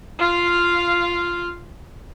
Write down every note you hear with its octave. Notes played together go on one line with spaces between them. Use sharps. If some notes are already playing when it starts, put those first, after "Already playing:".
F4 F5